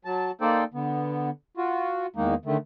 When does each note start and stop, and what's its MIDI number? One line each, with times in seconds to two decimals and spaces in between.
0.05 0.31 54
0.05 0.31 81
0.41 0.64 58
0.41 0.64 63
0.41 0.64 69
0.41 0.64 72
0.41 0.64 74
0.41 0.64 79
0.74 1.30 50
0.74 1.30 59
1.57 2.06 65
1.57 2.06 66
2.16 2.35 40
2.16 2.35 51
2.16 2.35 56
2.16 2.35 58
2.16 2.35 63
2.45 2.57 50
2.45 2.57 51
2.45 2.57 57